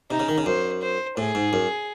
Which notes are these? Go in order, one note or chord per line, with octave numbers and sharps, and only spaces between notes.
C3 D#4
C#3
D#3
C#3
F#2 C5
C5
A2 G#4
G#2
F#2